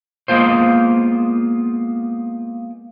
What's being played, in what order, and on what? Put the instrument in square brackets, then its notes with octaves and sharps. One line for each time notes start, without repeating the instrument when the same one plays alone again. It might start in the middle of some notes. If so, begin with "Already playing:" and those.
[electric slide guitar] G#3 A#3 B3 F4 C5